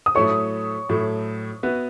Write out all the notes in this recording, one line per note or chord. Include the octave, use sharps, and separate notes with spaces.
D#6
A2 F#3 A3 E4 A4 C#5 C#6
A2 F#3 A3 E4 A4
B3 F#4 B4 E5